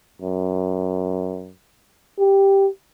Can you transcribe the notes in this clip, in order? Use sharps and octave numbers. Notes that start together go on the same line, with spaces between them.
F#2
G4